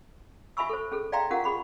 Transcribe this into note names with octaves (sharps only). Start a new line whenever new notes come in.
F#4 E5 G#5 B5 C#6 E6
A4 C5
C#4 G#4 A4
D5 E5 F5 G5 A#5 C6
C#4 F4 G4 A#4 F5 F#5
F#4 G#4 B5 C#6